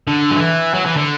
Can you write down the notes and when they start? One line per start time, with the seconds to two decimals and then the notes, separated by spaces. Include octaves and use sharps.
0.07 D3
0.31 F#3
0.37 E3
0.75 F#3
0.86 E3
0.97 D3